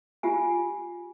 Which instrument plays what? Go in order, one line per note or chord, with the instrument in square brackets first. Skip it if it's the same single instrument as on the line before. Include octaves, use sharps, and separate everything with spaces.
[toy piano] F4 G4 G#5